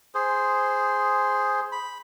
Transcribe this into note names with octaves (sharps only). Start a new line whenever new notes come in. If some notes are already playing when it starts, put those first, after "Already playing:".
G#4 C5
B5